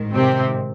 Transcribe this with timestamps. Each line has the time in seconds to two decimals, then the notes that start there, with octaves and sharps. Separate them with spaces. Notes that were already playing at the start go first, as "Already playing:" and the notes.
Already playing: A1 G#2 D#3
0.14 C3 C4